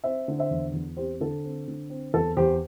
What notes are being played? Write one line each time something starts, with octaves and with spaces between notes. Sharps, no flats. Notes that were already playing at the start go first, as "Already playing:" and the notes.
C4 C5 E5
D3
C5 E5
E2
E2
C4 G4 C5
D3 A4
C4
D3
C4
E2 A4
E2 G4 C5